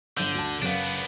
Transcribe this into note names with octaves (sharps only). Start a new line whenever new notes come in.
G1 D3 G6
D2 A5
F#1 B3 D4 F5